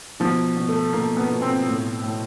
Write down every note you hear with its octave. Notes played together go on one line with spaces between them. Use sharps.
B2 F3
B2
A3
B2 A#3
B3
B2
C4
A2
A2